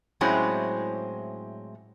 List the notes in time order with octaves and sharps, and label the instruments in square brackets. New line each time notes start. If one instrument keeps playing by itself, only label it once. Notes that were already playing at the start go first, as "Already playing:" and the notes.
[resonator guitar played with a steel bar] A2 F#3 G#3 C4 C#4 E4